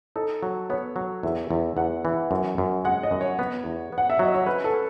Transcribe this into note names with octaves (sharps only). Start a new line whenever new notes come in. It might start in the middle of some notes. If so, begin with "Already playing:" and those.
D#4 A4
F#3
B3 C#5
F#3
E2 E5
E2
E2 F#5
E3
F#2
F#2
G#3 F#5
D#5
F#2
C#5
B3
E2
B3
F#5
E5
F#3 D#5
C#5
C#4 B4
A4
C#4